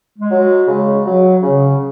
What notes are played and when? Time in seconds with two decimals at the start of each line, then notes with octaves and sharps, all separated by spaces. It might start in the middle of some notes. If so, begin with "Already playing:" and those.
0.17 G#3
0.31 F#3
0.68 C#3
1.06 F#3
1.43 C#3